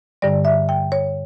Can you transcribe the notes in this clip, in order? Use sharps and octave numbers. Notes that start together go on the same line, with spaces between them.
G2 D3 G3 D5
E5
G5
C#5